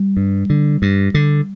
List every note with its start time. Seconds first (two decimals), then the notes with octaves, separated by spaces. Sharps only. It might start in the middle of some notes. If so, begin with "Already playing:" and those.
Already playing: G3
0.17 G2
0.50 D3
0.82 G2
1.14 D3